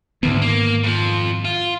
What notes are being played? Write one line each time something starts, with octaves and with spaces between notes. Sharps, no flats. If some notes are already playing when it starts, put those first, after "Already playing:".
D2 G#2 D#3 B3
A#3
F2 F3
F4